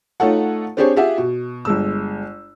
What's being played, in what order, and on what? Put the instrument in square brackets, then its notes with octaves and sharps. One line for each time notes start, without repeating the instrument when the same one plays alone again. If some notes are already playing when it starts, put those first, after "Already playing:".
[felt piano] A3 D#4 F4 A4 C#5 F#5
C4 D4 G4 G#4 C5 C#5
F4 G4 G#4 E5 F#5
B2
G1 G#3 E6